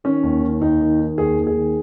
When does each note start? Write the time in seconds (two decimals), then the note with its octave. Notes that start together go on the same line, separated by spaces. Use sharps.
0.04 D#3 C#4
0.23 D#2
0.42 D#3
0.61 D#2 D#4
0.81 D#3
1.00 D#3
1.18 D#2 G#4
1.38 D#2
1.47 G#4
1.57 D#3